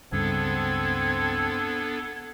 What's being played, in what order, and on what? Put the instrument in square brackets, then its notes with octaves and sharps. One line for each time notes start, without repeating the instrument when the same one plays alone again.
[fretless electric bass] C#2 G2 C#3 [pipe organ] B3 D4 A4 [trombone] C4 [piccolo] G#6